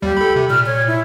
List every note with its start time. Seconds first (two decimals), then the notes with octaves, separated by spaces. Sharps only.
0.02 D#2 G3 G4
0.17 A4 B5
0.36 C3
0.50 A#2 F6
0.66 C#5
0.87 E4